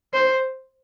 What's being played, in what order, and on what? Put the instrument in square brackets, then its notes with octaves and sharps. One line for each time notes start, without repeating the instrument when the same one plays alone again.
[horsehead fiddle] C5